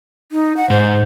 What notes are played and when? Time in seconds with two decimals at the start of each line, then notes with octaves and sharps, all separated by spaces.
0.32 D#4
0.57 F#5
0.70 G#2 C5